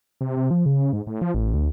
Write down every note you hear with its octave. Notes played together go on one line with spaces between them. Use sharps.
C3
C3
F3
C#3
G#2
A2
F3
A1
D2